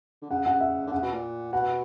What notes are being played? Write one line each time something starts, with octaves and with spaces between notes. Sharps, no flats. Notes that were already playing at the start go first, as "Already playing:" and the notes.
D3
C#3 F#5
C#3 F#5
E5
D3
C#3 F#5
B2
A#2
B2 F#5